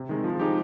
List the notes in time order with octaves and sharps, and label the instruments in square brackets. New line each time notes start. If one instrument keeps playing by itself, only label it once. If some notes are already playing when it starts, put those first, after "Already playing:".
Already playing: [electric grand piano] C3
D#3 G#3
F3
G#3 D#4 G4